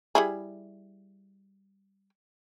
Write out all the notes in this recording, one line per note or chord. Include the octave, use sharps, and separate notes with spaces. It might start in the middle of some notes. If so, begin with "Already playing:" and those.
G3 E4 G#4